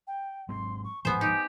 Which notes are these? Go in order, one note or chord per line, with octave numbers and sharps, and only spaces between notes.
G5
G#2 F#3 C4 C6
C#6
D1 G#2 F3 B3 C5 G#5
D#4 G4